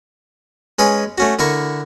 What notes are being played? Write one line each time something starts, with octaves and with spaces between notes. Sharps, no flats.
G#3 C#4 B4 D#6
A3 C#4 F#4
D3 E4 A#4 C#6